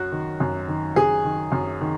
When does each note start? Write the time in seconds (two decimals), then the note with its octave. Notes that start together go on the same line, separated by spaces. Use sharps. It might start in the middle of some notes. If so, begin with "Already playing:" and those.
Already playing: F#2 F#4
0.12 D#3
0.40 F#2
0.68 D#3
0.96 F#2 G#4
1.25 D#3
1.52 F#2
1.81 D#3